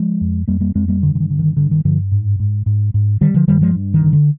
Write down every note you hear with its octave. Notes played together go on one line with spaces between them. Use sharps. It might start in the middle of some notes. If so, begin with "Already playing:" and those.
Already playing: F3 G#3
F2
F2 G3 A#3
G3 A#3
F2 G#3 C4
G3 A#3
G2 D3
D3
D#3
D3
D#3
G2 D3
D#3
G2 D3 F3
G#2
G#2
G#2
G#2
D3 D#3 G3
D3 F3
G2 D#3 G3
F3 G#3
G2
D#3
D3
D3